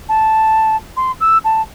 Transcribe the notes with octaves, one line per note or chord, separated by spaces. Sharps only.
A5
C6
E6
A5